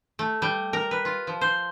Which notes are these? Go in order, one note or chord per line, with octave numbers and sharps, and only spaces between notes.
A3
G3
A#4
B4
F4
F3
C5